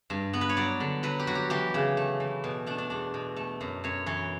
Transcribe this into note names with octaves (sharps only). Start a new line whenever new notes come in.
G2
B3
B4
C#5
F#3 D5
D3
F#3 B4
G4
F#3 F#4
G4
E3 G4
C#3
A3
E3
B2
A3 D4
D4
E2 D4
B2
A3
F#2
F#2 C#5
E3 C#5